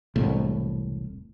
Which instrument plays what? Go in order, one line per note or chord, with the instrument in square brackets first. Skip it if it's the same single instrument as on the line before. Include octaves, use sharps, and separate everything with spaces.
[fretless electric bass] E1 C2 A2